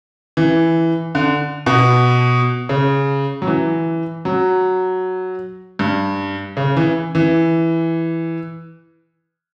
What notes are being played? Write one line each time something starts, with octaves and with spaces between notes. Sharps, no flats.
E3
D3
B2
C#3
F#3
E3
F#3
G2
C#3
E3
E3